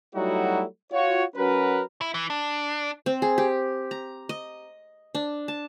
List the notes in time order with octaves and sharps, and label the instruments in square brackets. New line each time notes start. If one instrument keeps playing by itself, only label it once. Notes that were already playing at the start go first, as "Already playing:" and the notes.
[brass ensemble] F#3 G3 A3 D#4 E4 F#4
F4 F#4 C#5
F#3 C#4 F#4 A#4 B4
[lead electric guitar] E4
E3
D4
[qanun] C4
G#4
G4
A#5
D#5
D4
A5